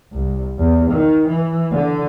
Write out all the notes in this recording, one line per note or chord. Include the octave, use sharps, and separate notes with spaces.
C2
E2
D#3
E3
D3